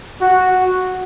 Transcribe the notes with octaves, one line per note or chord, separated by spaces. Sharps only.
F#4